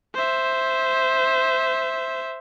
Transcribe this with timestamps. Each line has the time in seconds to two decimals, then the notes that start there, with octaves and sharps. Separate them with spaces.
0.14 C5 E5